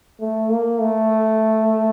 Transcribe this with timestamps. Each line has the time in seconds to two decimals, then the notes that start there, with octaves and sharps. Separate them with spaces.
0.21 A3
0.50 A#3
0.80 A3